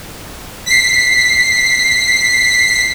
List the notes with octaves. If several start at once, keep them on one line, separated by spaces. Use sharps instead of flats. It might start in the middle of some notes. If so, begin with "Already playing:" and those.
B6 C7